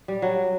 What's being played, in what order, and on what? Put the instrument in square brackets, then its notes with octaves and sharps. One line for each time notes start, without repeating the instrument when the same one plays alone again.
[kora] G3
F#3